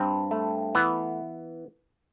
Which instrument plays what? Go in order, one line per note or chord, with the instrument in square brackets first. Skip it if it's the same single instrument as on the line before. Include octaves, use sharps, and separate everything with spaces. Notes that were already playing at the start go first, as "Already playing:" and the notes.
Already playing: [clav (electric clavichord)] G2 C4
A3
E3 B3